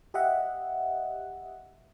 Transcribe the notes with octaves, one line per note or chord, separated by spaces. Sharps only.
G4 D#5 E5 F#5